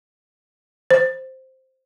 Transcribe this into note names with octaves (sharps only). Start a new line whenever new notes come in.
C5